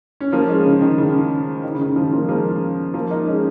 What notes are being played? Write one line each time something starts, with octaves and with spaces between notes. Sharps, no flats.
C#4
F3 A#3
G#3 C#4
C#3
D#3
C#3
D#3
C#3
D#3
C#3 F3
F3 A#3
G#3
F3 A#3
F3 A#3
A#3 D#4
G#3 C#4